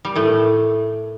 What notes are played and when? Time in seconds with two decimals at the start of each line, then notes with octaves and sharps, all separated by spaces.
0.05 G3
0.16 A2 A3